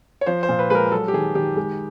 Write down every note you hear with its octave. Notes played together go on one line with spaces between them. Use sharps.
C#5
F3 C5
C5
A#2
B4
G#3 A#4 B4
F#3 A4
G4
D#3 G#4
D#3 G4
G#3